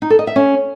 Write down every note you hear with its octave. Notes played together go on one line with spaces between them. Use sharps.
D#4
A4
D#5
E5
C#4